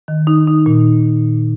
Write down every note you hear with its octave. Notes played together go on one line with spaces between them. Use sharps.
D#3
D#4
D#4
A#2